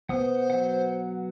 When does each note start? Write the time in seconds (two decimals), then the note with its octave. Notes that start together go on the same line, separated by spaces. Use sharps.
0.09 B3 C5 F#5 D#6
0.50 F#3 F#5